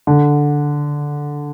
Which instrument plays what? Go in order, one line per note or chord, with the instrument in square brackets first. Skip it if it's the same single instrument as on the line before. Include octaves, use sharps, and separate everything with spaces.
[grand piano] D3